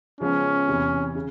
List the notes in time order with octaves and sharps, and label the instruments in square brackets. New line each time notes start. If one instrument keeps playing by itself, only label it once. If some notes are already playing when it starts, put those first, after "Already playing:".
[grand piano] C#3 F3 G#3 B3 [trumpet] C#4
[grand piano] E2 C3 E3
C#3